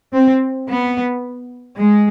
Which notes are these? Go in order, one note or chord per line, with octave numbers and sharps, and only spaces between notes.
C4
B3
G#3